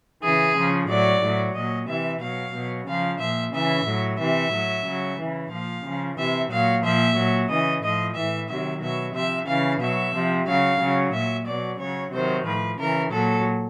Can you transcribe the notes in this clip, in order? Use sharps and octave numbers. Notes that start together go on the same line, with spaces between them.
C#3 E3 G#4
C#3 F3
A2 F#3 D5
A2 F#3
A#2 F#3 D#5
C3 E3 E5
B2 F#3 F5
B2 F#3
C#3 F3 F5
A#2 F3 E5
C#3 E3 E5
A2 F#3
C3 E3 E5
A2 F#3
C#3 F#3
C#3 E3
A#2 F3 F5
C#3 F3
C3 E3 E5
A#2 F#3 F5
A#2 F3 E5
A#2 F#3
C#3 E3 D#5
A2 F3 D#5
A2 E3 E5
C3 D#3 F#3 E5
B2 F#3 E5
C3 F3 E5
C#3 E3 F5
B2 F#3 E5
C3 F3
C#3 F#3 F5
C#3 F#3
A#2 F#3 E5
B2 F#3 D5
C#3 F#3 C#5
C3 D#3 F#3 C5
A2 F3 B4
C#3 E3 A#4
A#2 F#3 A4